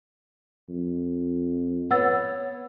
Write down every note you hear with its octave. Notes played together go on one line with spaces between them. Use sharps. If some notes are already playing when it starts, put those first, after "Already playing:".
F2
B3 C#5 F#5 E6 A6